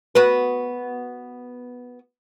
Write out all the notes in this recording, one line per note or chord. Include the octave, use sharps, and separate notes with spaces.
B3 F#4 B4